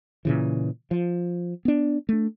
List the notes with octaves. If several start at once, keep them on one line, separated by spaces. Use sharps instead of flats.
A#2 C#3 E3
F3
B3 D4
A3 D4